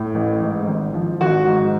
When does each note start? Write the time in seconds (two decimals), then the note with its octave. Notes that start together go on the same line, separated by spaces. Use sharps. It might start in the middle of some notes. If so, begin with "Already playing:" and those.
Already playing: A2
0.15 A1
0.41 G#2
0.68 G#1
0.94 F3
1.21 G#1 F#4
1.47 G#2